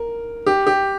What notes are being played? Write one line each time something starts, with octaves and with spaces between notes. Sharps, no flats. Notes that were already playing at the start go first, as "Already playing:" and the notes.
Already playing: A#4
G4
G4